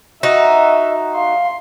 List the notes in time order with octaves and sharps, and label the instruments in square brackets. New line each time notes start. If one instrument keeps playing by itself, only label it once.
[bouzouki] D#4 F#4 [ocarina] D#5 [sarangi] E5
[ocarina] F5 [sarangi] C6